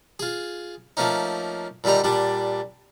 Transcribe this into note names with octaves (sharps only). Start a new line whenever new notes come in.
F4 G#4
F3 A3 A#3 C#4 D#4
A#2 D3 G3 D#4 A#5
A#2 G3 D4